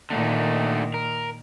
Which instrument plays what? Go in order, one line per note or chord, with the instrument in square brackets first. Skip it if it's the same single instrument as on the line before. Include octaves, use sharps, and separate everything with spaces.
[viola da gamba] A#2 D#3 [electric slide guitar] D3 A3 D#4
[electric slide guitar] A#4